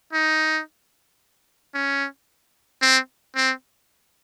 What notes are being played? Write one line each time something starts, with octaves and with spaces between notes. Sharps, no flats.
D#4
C#4
C4
C4